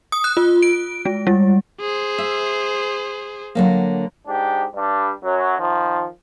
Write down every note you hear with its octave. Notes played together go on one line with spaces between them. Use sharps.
D#6
F#6
F4
D7
G#3
G3
G#4 C5
E5
D3 F#3 A#3
G#2 D4 G4
G2 G3 D4
F#2 F#3
D#3 F3